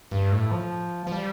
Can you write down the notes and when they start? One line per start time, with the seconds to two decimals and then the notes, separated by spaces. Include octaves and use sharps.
0.11 G2
0.32 A2
0.51 F3
1.07 F3
1.12 G3